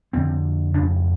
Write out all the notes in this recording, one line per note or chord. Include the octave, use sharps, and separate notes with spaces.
F2 D3 C4
F2 C#3 D4